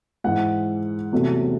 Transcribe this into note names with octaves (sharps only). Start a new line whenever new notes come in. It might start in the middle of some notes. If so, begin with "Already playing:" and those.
G#2 E3 G#3 F#5
E2 C3 F#3 A3